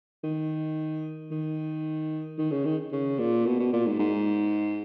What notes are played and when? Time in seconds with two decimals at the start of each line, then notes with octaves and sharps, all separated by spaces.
0.24 D#3
1.31 D#3
2.38 D#3
2.51 C#3
2.65 D#3
2.92 C#3
3.19 A#2
3.46 B2
3.59 B2
3.73 A#2
3.87 G#2
3.99 G#2